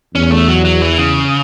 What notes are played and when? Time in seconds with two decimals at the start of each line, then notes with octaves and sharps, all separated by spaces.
0.15 E2 C#4
0.31 A3
0.48 F#3
0.65 F#3
0.82 E3
0.98 C#3